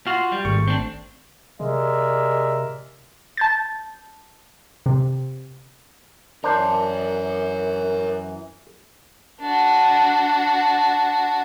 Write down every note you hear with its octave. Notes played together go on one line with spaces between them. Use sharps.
F4 F#4 C6 F6
G3
G#1 A3 C#6
C4 D4
C3 G#3 A#4 D5 E5
A5 G6 A6
C3
F#2 E3 D4 A#4 C5 C#5
D4 F#4